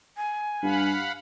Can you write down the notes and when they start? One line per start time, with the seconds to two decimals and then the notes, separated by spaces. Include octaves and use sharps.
0.17 G#5
0.62 G2 F5 F#5 B5